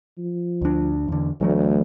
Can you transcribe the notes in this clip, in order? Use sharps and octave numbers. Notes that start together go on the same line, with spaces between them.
F3
D2 D4
E2 D3
D2 E3 F#3 A3